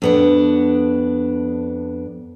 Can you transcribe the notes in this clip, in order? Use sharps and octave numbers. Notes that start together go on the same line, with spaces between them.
F2 B3 D4